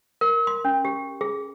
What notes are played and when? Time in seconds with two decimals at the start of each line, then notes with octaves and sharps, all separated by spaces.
0.21 A#4
0.47 C6
0.65 C#4
0.85 G4
1.21 G#4